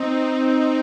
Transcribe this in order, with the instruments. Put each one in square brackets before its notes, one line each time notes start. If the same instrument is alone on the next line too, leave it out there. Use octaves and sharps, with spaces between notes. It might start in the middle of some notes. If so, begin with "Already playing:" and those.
Already playing: [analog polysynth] C4 D#4